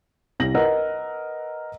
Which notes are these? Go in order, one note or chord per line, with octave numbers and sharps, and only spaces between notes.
C2 A#6 F#7
A#4 B4 D#5 F#5 E6